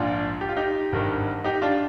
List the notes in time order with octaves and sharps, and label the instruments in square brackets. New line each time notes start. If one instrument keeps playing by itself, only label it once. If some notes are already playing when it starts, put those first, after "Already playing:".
Already playing: [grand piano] A#1 G#2 D4 F4
G4
F4
D#4 G4
G#1 G2 D#3
D#4 G4
D4 F4